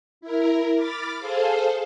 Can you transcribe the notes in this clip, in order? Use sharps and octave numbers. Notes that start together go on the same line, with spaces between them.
E4 A#4
B5 D6 F6 A6
G#4 A4 C5 F5